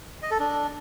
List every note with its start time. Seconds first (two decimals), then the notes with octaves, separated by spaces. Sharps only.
0.23 D#5
0.31 A4
0.40 D4